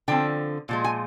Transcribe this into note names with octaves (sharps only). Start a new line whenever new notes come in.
D3 F3 C4 G5
A#2 F3 G#3
G#5